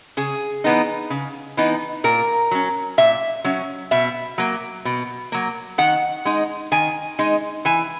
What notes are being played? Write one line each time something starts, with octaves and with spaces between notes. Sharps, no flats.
C#3 G#4
E3 B3 D#4
C#3
E3 B3 D#4
A#2 A#4
F#3 C#4
A#2 E5
F#3 C#4
B2 E5
F#3 A#3
B2
F#3 A#3
D#3 F#5
G#3 D#4
D#3 G#5
G#3 D#4
E3 G#5